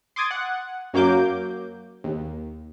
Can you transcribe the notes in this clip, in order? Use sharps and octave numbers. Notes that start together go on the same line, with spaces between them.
C6 D6 D#6 G#6 A6
F#5
F#2 F#3 A#3 D6 G6
D#2